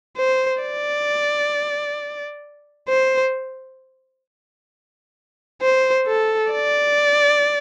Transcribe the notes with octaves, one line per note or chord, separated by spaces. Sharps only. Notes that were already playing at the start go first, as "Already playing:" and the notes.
C5
D5
C5
C5
A4
D5